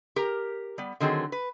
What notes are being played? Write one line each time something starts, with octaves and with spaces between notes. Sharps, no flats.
G4 A#4 A#5
G3 B3
D3 D#3 F#3 C4 G#4
B4